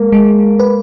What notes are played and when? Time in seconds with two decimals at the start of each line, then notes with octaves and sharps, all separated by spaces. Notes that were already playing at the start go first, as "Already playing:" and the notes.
Already playing: G#3 A#3
0.12 G#3
0.59 B4